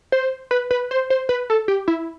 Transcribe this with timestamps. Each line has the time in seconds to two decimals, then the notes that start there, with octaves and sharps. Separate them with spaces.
0.12 C5
0.51 B4
0.71 B4
0.91 C5
1.10 C5
1.29 B4
1.50 A4
1.68 G4
1.88 E4